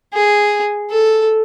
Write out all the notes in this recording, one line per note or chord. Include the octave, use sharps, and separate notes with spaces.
G#4
A4